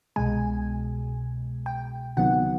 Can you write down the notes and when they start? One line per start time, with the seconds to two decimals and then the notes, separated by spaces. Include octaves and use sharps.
0.16 C2 B2 G#3 G#5
1.66 G5
2.17 C#2 C3 D#3 F#3 B3 F#5